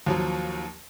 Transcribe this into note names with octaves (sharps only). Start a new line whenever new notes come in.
D#2 F3 F#3